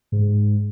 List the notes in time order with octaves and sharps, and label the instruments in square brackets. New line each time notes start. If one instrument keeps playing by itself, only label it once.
[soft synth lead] G#2